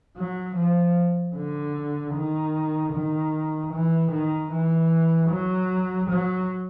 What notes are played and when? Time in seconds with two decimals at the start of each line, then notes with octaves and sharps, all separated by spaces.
0.16 F#3
0.56 F3
1.36 D3
2.14 D#3
2.93 D#3
3.73 E3
4.12 D#3
4.51 E3
5.30 F#3
6.10 F#3